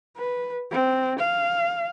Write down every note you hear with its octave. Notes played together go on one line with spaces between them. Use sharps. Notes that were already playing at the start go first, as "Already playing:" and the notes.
B4
C4
F5